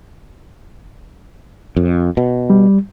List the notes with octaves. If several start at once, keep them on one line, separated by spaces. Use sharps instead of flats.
F2
B2
G3